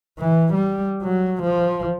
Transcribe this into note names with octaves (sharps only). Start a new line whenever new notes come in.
E3
G3
F#3
F3